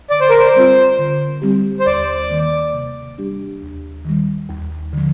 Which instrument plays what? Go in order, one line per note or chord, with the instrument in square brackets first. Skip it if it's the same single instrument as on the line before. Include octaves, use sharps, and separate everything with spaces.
[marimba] D3 [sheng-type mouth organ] D5
[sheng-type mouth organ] C5
A#4
C5
[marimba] G3 C4 F4
D3
G3 C4 G4
[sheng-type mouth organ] C5
[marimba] D#2 [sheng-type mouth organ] D5
[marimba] D#3 A#3
C3
G3 D4 G4
D#2
D#3 G3
D#2
D3 F3